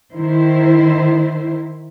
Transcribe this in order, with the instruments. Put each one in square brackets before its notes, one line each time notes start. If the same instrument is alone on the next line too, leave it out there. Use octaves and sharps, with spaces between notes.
[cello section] D#3 E4 C5